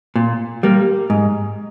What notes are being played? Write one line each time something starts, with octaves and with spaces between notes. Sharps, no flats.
A#2
G3 A#3
G#2